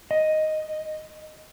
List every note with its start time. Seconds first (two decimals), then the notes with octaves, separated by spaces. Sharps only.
0.11 D#5